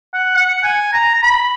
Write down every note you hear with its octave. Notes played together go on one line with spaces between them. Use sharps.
F#5
F#5
G#5
A#5
A#5
B5